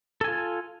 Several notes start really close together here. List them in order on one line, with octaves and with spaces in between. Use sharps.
A4 G#5 F4